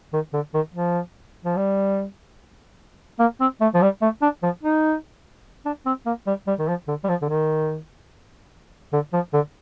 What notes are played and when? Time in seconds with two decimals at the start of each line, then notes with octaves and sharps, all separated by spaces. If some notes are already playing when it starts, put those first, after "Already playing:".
0.13 D#3
0.33 D3
0.54 D#3
0.74 F3
1.45 F3
1.56 G3
3.19 A#3
3.40 C4
3.61 A3
3.74 F3
3.82 G3
4.02 A3
4.22 D4
4.43 F3
4.63 D#4
5.65 D4
5.86 C4
6.06 A#3
6.26 G3
6.47 G3
6.59 D#3
6.68 F3
6.88 D3
7.04 G3
7.08 F3
7.22 D3
7.29 D#3
8.93 D3
9.13 F3
9.33 D3